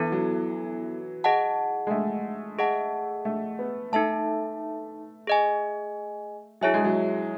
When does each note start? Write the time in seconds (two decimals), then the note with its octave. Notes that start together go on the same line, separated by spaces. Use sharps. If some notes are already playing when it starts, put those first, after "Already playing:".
Already playing: E3 B3 E4 A4
0.12 F#3
1.24 G#4 D#5 F#5 A5
1.87 G#3
1.91 A3
2.59 G#4 D#5 F#5 A5
3.25 A3
3.59 B3
3.92 A3 D#4 A4 E5 A5
5.27 G#4 D#5 G#5
6.61 F#3 E4 G#4 C#5 E5 G#5
6.74 G#3
6.84 F#3